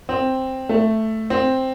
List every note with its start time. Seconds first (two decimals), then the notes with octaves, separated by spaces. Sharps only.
0.09 C4
0.69 A3
1.30 C4